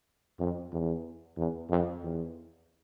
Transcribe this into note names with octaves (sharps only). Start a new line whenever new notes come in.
F2
E2
E2
F2
E2